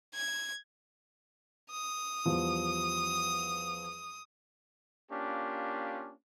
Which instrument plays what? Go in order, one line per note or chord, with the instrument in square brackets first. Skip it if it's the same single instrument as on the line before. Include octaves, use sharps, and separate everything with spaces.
[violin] G#6
[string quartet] D#6
[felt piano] E2 F3 G3
[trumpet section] A#3 C#4 D4 F4 G4